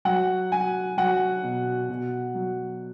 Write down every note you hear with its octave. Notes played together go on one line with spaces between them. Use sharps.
F#3 F#5
F#3 G#5
F#3 F#5
B2
B2
F#3